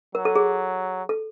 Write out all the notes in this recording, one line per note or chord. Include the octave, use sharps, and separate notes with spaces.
F#3 A#4
A4
G#4
A4